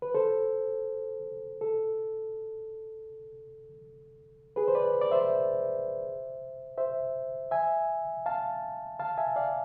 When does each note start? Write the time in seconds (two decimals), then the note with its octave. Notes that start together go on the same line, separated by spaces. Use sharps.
0.02 B4
0.15 A4 C5
1.61 A4
4.56 G#4 B4
4.68 C5
4.75 B4 D5
5.01 D5
5.11 C5 E5
6.78 C5 E5
7.51 E5 G#5
8.26 F5 A5
9.00 F5 A5
9.17 E5 G#5
9.36 D5 F5